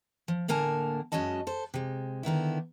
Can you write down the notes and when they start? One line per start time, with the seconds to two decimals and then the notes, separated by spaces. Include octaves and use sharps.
0.28 F3
0.48 A2 D3 A#3 A#4 G#5 A5
1.12 F#2 G#3 C#4 F#4 D#5 A5
1.47 A4 C5
1.74 C3 G#3
2.23 D3 D#3 B3 E4